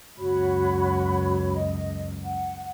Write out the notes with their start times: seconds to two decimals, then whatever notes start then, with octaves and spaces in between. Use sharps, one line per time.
0.19 C#2 F#2 F#4 C#5 B5
1.53 D#5
2.22 F#5